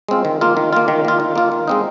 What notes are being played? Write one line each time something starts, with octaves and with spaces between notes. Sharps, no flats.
G#3 C4 F4
D#3
A#3 F4
D#3
A#3 F4
D#3
A#3 F4
D#3
A#3 F4
D#3
G#3 C4 D#4